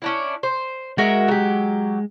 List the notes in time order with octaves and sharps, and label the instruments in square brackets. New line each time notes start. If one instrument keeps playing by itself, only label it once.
[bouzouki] C#4 D4 E4
C5
[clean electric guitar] G#3 [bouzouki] F#4 A#4 E5
[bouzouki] F#3 G4